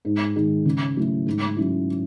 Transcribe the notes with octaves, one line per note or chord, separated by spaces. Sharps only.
G#2
D#3 G#3 D#4
C#3
F#3 A3 E4
G#2
F#3 C#4 E4